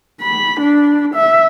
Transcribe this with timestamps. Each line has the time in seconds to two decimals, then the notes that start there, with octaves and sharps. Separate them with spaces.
0.21 B5
0.60 D4
1.15 E5